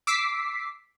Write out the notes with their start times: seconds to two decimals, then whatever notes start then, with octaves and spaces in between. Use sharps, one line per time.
0.07 D6 E6 B6 C7